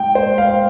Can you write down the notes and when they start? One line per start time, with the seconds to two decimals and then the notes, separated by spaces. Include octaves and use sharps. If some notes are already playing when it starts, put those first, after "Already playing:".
Already playing: G#2 G5
0.15 C5
0.38 F5